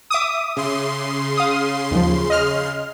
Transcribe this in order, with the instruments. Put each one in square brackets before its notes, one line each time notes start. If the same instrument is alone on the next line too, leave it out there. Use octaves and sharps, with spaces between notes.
[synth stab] E5 D6 D#6
[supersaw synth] C#3 C6
[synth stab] F5 D#6
D#2 F3
D#5 F6